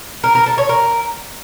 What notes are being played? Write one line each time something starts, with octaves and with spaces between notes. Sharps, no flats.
A#4
A#4
A4
C#5
A#4